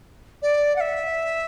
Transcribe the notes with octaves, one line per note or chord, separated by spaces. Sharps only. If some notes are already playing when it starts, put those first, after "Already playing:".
D5
F#5
E5